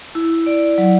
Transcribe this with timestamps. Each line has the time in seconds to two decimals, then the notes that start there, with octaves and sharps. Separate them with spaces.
0.15 E4
0.46 D5
0.78 F#3